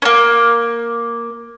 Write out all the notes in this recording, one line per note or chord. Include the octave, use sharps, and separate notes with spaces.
A#3 C#4